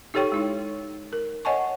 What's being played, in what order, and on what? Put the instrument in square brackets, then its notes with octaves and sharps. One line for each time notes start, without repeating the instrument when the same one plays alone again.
[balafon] D#4 G4 A4 C#5 G5 C#6
G#3 D#4 E4
A#4
C#5 D#5 F#5 G#5 A5 C#6